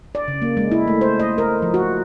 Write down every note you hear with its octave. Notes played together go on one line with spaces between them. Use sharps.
D5
C#3
A#3
G#3
E4
A3
C5
D#5
A#4
F3
F#4